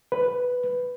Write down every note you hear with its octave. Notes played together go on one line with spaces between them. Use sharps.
B4